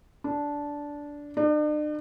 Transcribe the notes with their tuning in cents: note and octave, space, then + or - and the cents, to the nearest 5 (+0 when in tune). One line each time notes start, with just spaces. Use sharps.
D4 -10
D4 +45